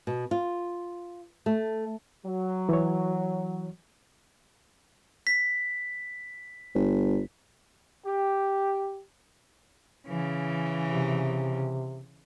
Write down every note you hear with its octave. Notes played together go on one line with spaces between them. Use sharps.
B2
F4
A3
F#3
E3 C#5
B6
G1
G4
C#3 E3
C3